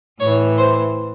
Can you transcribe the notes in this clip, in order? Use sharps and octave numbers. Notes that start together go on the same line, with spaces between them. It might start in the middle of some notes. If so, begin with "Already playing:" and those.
A2 E3 C#5
C5